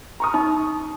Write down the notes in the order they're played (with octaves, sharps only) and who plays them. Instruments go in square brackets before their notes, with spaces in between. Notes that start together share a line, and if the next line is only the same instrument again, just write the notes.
[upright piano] A#5 C#6 D#6
[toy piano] D#4